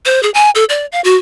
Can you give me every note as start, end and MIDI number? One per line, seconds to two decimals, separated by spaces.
0.06 0.22 72
0.23 0.30 68
0.34 0.50 80
0.55 0.64 69
0.69 0.86 74
0.92 1.01 77
1.04 1.16 66